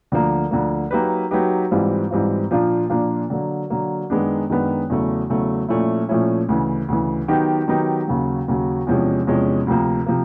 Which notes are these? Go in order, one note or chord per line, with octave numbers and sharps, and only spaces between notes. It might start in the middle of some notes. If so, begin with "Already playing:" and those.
D2 D3 F3 A#3
D2 D3 F3 A#3
F#3 A#3 D#4 G4 B4
F#3 A#3 D#4 G4 B4
G#2 E3 G3 C4 F4
G#2 E3 G3 C4 F4
A#2 F3 A#3 D4 F4
A#2 F3 A#3 D4 F4
D3 F#3 A#3
D3 F#3 A#3
F#2 D#3 G#3 B3 D4
F#2 D#3 G#3 B3 D4
E2 C#3 F#3 A3
E2 C#3 F#3 A3
A#2 F3 A3 C#4 E4
A#2 F3 A3 C#4 E4
D2 C#3 E3
D2 C#3 E3
D#3 F#3 B3 D#4 G4
D#3 F#3 B3 D#4 G4
D#2 C#3 F#3
D#2 C#3 F#3
E2 C3 F3 G#3 C#4
E2 C3 F3 G#3 C#4
D2 C3 F3 A#3
C3 F3 A#3